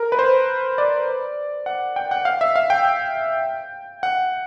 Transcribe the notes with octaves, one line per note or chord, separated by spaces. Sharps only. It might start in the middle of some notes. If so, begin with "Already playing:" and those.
Already playing: A#4
B4
C5
D5
F#5
G5
F#5
F5
E5
F5
G5
F#5